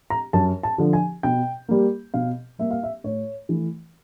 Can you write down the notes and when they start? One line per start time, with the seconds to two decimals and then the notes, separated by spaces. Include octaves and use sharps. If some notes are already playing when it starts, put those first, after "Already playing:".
0.10 A#5
0.33 F#2 A5
0.63 A5
0.78 D3 F3
0.93 G#5
1.23 B2 G5
1.69 G3 A#3
2.14 B2 F5
2.59 G3 A#3 E5
2.71 F5
2.83 E5
3.04 A2 C#5
3.49 E3 A3